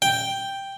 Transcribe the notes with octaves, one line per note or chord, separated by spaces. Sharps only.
G5